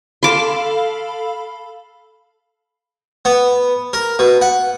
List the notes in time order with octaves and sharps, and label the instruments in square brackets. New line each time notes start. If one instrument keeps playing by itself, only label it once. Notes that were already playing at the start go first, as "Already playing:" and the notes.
[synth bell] A4 F5 B5 [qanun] C6 D6
[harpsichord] B3
A#4
B2
F#5